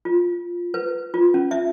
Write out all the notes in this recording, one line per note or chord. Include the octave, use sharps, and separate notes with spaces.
F4
B4
F4
C#4
E5